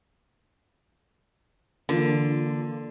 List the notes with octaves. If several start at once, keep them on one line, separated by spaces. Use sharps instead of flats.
D3 E3 A#3 F4